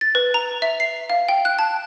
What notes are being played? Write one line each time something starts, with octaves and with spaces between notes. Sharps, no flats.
A6
B4
A#5
E5
C7
F5
G5
F#6
A5